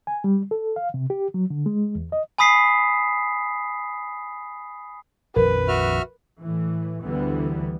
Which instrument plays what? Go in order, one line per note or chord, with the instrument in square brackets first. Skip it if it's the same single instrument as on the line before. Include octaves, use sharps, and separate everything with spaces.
[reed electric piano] G#5
G3
A4
F5
C3
G4
F#3
D3
G#3
E2
D#5
[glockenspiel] G#5 B5 D#6 B6 C7
[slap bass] A#1 F2 D#3 [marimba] A#4 [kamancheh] B4
[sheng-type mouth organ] F#4 E5 F6
[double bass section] A2 E3
D2 D3 E3 G3 B3